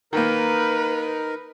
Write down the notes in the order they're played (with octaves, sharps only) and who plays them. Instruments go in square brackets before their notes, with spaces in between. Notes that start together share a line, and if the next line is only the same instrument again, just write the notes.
[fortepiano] D#3 A#3 [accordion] D#4 A#4 [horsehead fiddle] B4